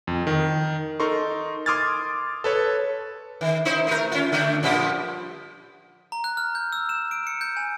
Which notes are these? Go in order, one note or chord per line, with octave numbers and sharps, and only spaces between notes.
F2
D#3
D#4 A4 A#4 C6 C#6
C6 D6 D#6 F6 G#6 A6
A4 B4 C#5
D#3
D#4 E4 C5
A3 A#4
C#4 F4
D3 A3 D4
A#2 F3 G3
A#5
F#6
F6
G6
E6
E7
D7
C#7
G6
G#5